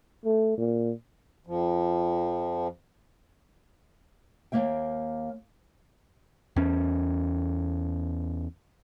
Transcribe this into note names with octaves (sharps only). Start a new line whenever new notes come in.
A3
A#2
F2 F3
D#2 F3 A#3 E5 G5
E2 C#4